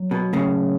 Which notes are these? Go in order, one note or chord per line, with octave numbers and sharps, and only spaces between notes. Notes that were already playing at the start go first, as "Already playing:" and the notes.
Already playing: F#3
B2
A2 C#3